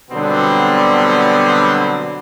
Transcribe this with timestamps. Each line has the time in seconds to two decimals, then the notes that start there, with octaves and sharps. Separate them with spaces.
0.11 B2 D3 F#3 G3 B3 C4